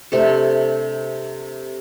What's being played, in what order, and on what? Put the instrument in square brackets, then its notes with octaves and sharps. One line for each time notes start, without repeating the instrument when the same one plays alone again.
[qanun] C3 A3 D4 A4